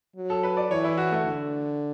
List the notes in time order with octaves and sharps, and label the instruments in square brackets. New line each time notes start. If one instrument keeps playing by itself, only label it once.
[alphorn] F#3
[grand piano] A4
B4
D5
[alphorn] E3 [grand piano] C#5
[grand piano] E4
F#4
A3
[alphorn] D3